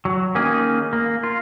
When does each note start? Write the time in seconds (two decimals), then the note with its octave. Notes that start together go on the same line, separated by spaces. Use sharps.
0.05 F#3
0.35 D#3 A#3 C#4 D#4 G#4
0.93 A#3
1.23 F4